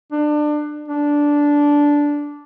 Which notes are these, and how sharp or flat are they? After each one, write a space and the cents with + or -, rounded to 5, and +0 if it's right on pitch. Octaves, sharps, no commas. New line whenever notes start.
D4 +25
D4 -10